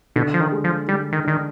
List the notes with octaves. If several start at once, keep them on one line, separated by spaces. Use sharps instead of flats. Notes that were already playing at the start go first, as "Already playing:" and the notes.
B2 D3
F3
D#3
G#3
F3
D3 G3
D#3
D#3 D4